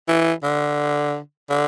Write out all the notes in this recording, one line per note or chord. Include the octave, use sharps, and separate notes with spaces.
E3
D3
D3